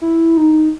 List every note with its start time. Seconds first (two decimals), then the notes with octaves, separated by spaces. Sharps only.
0.02 E4
0.37 D#4